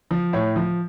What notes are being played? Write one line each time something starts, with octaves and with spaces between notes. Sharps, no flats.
F3
A2 C#5
F3